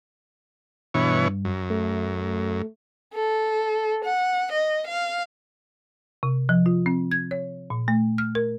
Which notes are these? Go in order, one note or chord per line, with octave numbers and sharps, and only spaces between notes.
G2 B2 E3 C#5
F#2
A3
A4
F#5
D#5
F5
C3
F3
F4
C4
G#6
C#5
A#2
A3
F6
A#4